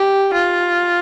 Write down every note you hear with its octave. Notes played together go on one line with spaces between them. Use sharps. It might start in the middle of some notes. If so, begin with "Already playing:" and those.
Already playing: G4
F4